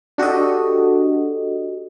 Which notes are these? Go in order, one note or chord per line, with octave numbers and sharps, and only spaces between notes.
D4 F#4 G4 A4 D#5